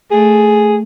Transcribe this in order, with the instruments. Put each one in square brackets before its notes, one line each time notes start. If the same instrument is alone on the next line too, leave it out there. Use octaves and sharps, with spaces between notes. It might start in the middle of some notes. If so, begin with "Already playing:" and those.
[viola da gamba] A3 [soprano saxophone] G#4